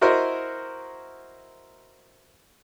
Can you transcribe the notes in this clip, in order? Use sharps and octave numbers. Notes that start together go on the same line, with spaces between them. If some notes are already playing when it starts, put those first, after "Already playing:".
E4 F#4 A#4 C5 D#5